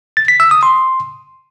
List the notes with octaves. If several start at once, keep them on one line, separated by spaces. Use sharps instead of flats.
A6
B6
E6
D#6
C6